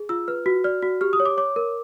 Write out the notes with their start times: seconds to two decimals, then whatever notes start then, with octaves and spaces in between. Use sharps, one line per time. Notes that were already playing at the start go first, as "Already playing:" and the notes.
Already playing: G#4
0.09 F4 E6
0.28 B4 F6
0.46 F#4
0.64 D5 F6
0.82 F#4
1.01 G4 F6
1.13 D#6
1.20 C#5
1.26 D6
1.37 C#5 D6
1.56 A#4